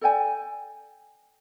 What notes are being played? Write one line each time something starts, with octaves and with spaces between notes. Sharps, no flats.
A4 D5 G5 G#5